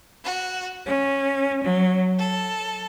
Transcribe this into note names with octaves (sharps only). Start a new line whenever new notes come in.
F#4
C#4
F#3
A4